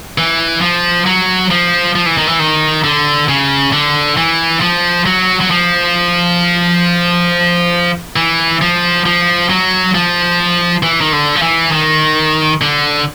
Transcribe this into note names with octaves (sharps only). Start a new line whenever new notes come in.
E3
F3
F#3
F3
F3
E3
D#3
E3
D#3
D3
C#3
D3
E3
F3
F#3
F#3
F3
E3
F3
F3
F#3
F3
E3
D#3
D3
F3
E3
D#3
D3